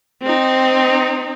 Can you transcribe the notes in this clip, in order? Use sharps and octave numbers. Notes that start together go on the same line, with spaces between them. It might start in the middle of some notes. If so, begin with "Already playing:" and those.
C4 D#4